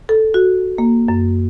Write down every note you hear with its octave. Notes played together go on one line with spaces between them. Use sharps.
A4
F#4
A#3
F#2